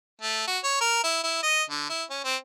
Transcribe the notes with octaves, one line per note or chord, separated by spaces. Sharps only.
A3
F#4
C#5
A#4
E4
E4
D#5
D3
E4
C#4
C4